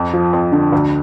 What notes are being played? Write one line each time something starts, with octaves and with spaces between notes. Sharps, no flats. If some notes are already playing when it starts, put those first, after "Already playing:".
Already playing: F2
F3
F2
D3
D2